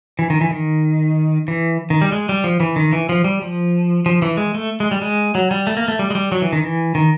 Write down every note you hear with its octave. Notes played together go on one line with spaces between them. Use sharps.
E3
D#3
E3
D#3
E3
D#3
G3
G#3
G3
F3
E3
D#3
E3
F3
G3
F3
F3
E3
G#3
A3
G#3
G3
G#3
F#3
G3
A3
A#3
A3
G3
G#3
G3
F#3
E3
D#3
E3
D#3